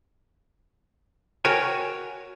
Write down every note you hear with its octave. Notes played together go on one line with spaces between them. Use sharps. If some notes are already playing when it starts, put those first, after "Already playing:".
F#4 A#4 C#5 G5 G#5